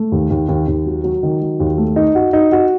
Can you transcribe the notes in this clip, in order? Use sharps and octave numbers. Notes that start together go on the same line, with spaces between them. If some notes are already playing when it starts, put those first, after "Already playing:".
Already playing: A3
D#2
D#2
D#2
D#2
F#3
F#3
D#3
F#3
D#2
A3
D#4
F#4
D#4
F#4